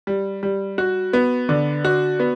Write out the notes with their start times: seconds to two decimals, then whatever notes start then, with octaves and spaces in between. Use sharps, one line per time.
0.07 G3
0.43 G3
0.78 F#4
1.13 B3
1.49 D3
1.85 F#4
2.20 B3